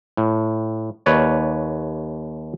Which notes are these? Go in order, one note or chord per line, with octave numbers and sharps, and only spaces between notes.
A2
D#2 B4 C#5 D5